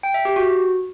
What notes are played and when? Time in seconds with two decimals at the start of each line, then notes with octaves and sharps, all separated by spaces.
0.03 G5
0.14 E5
0.25 G4
0.36 F#4